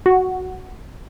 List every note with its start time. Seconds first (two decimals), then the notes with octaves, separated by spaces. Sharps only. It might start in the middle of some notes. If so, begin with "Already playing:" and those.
0.06 F#4